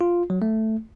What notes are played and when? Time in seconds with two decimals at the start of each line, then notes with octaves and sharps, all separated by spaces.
0.01 F4
0.30 F#3
0.42 A3